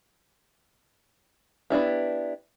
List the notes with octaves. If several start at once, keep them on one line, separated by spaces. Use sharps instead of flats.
B3 D4 E4 G4